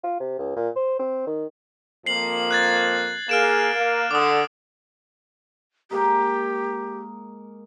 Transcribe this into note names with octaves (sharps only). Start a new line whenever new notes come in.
F4
C3
C#2
A#2
C5
C4
D#3
F2 F3 A#3 C7 F#7
F#6 G#6 A6
A#3 G#4 F6 D7 E7
A#3
D3 D6 D#6
G#3 A#3 D#4 G4